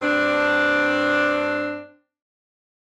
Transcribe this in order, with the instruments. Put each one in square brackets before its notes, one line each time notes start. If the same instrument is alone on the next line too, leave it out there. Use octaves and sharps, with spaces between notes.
[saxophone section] G2 C4 D4